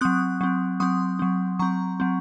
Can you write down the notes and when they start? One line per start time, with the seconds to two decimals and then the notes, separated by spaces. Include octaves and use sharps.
0.01 F#3 C4 D#6 F#6
0.41 F#3 C4
0.80 F#3 C4 C6 D#6
1.19 F#3 C4
1.59 F#3 C4 A#5 C#6
2.00 F#3 C4